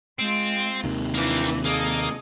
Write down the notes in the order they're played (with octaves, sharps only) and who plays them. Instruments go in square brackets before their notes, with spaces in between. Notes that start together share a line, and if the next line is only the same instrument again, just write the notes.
[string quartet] G#3 F4 [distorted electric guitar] C4
[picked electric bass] D#2 C3 D#3
[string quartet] E3 D4 [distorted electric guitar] A#3 G4
[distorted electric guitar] A#3 [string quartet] G#4 A4 D#5